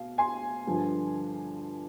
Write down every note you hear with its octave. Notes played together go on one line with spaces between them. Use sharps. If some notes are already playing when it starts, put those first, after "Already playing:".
Already playing: B2 F5
G#5 C6
G2 D3 F3